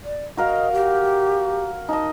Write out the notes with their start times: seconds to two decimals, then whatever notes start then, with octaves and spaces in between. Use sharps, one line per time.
0.04 D5
0.37 F#4 A#4 D#5 F5
0.73 G4
1.89 D#4 D#5 A5